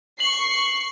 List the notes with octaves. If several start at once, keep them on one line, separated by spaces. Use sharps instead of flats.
C#6 C7 F#7